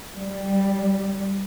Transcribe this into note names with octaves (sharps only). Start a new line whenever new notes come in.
G3